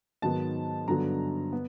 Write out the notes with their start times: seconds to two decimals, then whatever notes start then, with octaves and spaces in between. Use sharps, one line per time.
0.22 G#2 D#3 F#3 B3 A5
0.88 G2 D3 F#3 B3 A#5
1.52 B3